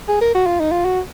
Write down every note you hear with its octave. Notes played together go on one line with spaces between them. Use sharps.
G#4
A#4
F#4
F4
D#4
F4
F#4